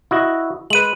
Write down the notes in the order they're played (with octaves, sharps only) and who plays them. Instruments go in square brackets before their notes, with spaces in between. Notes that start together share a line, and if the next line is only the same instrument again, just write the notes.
[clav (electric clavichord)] E4 F#4 D#5
[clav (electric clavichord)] G#3 B4 [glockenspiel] D#7 F#7